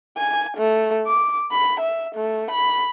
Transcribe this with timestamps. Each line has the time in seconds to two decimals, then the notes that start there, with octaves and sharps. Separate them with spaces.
0.18 G#5
0.57 A3
1.07 D6
1.52 B5
1.80 E5
2.15 A3
2.51 B5